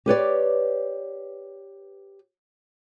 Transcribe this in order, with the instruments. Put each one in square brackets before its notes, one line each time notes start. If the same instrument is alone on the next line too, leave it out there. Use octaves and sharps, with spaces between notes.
[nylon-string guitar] G4 B4 C#5 D5